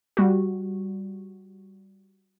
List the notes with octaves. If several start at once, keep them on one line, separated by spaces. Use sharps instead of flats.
G3 F#4